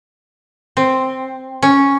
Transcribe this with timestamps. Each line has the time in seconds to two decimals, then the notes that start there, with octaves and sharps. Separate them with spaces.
0.77 C4
1.62 C#4